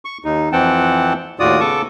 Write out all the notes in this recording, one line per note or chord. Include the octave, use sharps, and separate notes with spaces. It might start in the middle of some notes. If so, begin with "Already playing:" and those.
C#6
D#2 D#4
F2 E3 C4 F#5 G5 A5
D#2 A2 F4 F#4 D5 D#6
C#3 B3 A4 A5 C#6 D6